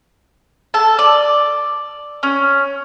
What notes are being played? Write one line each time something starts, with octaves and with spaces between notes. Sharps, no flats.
A4 A5
D5
C#4